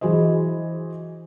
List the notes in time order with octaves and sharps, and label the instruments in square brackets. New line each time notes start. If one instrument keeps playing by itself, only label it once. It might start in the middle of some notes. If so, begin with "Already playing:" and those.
[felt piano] E3 F#4 G#4 C5 D#5